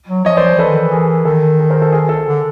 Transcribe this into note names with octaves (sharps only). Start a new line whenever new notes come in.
F#3
F3 C#5 D#5
C5 D5
F3
E3 A4 B4
D#3
E3
G#4 A#4
D#3 A4
G#4 A#4
A#4 C5
A4
G#4 A#4
A4
D3